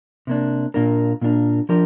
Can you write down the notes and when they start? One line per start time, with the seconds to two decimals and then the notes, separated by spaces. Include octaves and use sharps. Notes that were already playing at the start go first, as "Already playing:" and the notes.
0.27 C3 A#3 D4
0.74 A#2 A#3 D4 A#4
1.21 A#2 A#3 D4 A#4
1.69 F3 D4 G4 A#4